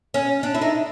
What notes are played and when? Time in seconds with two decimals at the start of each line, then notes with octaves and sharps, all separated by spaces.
0.14 C#4
0.43 D4
0.54 E4
0.62 D#4